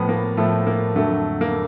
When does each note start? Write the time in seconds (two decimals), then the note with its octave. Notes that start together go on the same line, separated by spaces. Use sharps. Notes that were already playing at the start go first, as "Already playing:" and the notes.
Already playing: A2 F3 B3
0.09 A#3
0.37 A2 F3 A3
0.67 A#3
0.95 F2 D3 F#3 A3
1.41 A#3